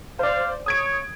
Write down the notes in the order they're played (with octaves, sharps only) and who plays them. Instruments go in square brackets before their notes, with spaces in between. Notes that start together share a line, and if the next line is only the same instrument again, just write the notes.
[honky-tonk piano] C5 D5 [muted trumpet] F5
[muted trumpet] C#5 [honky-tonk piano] D#6 G#6 D7